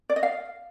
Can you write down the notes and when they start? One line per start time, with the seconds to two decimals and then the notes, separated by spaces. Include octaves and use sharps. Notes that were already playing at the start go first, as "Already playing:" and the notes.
0.09 D5
0.16 D#5
0.23 F5